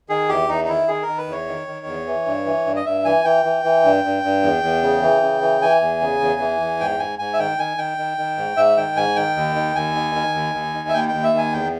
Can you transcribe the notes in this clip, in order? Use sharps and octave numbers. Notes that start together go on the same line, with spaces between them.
D#3 G#4
E2 G4
E2 D#4
D#4
D#3 E4
D#3 G#4
A#4
D#3
B4
E2 C#5
D#3
D#3
E2
E3
G2
E3
G2
D#5
G2 E5
E3 G#5
E3 G5
E3
E3
G2
G2
G2
E2
E2
C#3
E3
C#3
E3
E3 G#5
E2
C#3
E2
E3
E2
G#2 G5
G#2 G#5
G#2 G#5
E5
D#3 G5
D#3 G#5
D#3 G5
D#3
D#3
G#2
G#2 E5
D#3 G5
G#2 G#5
D#3 G5
D#2
D#3
D#2 G#5
D#3
D#3
D#2
D#2
D#3
E5
D#2 G5
G5
D#2
E5
D#3 G#5
E2 G5